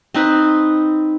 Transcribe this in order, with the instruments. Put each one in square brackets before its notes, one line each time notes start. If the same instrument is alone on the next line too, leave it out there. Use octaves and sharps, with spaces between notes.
[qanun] C4 D#4 B4